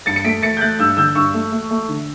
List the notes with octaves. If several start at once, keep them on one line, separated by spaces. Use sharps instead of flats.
G2 A6 C#7
C#7
A3 B6 D7
A3 A6 C#7
G6
A3 F#6 A6
G2 E6 G6
D3 E6 G6
G2 C#6 E6
A3
A3
A3
D3